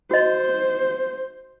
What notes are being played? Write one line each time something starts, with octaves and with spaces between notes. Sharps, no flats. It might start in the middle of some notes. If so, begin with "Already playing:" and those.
F#4 C5 D#5